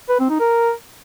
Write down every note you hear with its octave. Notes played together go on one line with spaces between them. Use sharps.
B4
C4
D#4
A#4